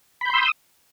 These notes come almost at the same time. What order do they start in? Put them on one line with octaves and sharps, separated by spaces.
B5 G6 C6 E6 D#6